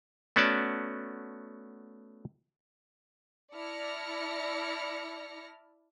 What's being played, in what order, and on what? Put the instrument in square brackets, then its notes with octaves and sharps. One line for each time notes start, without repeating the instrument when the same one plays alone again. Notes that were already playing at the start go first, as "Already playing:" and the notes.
[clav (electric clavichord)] A3 B3 C#4 F#4 D5 A5
[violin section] E4 D5 A5 F6 A#6 C#7